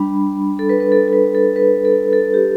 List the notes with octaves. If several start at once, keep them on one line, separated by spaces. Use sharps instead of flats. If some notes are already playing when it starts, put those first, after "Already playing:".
Already playing: G3 D4 B5
A4
B4
B4
A4
A4
B4
A4
B4
A4
A4
G4